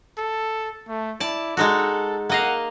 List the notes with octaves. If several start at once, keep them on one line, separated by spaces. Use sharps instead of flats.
A4
A3
E4 D5 A5
G#3 D#4 F#4 A4
A#3 D#5 F5 F#5